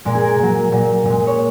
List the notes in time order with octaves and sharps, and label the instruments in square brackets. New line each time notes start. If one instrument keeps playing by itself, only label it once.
[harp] A#2 G#3 A#4
G#4
A#4
A#2 F#3
A#2 F#3
A#2 G#3
C#5